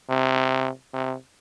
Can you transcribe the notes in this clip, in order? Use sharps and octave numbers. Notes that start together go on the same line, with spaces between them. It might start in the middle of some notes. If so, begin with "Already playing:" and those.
C3
C3